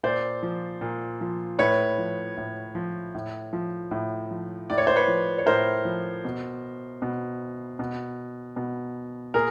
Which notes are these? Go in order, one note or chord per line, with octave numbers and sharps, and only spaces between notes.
A#2 C5 D5
F3
A#2
F3
A2 B4 C#5
F3
A2
F3
A2
F3
A2
F3
A2 D5
C#5
C5
B4 C#5
F3
C#5
A2 A#4 C5
F3
B2
B2
B2
B2
A#2 G#4 A#4